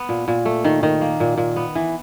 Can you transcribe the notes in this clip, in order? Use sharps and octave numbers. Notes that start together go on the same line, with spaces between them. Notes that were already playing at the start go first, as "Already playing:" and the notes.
Already playing: B3
A#2
A#2
A3
D#3
D#3
A#3
A#2
A#2
B3
E3